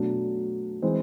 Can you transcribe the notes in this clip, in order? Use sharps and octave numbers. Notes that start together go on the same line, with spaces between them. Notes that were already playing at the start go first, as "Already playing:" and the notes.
Already playing: B2 F#3 A3 D4
E3 G#3 C4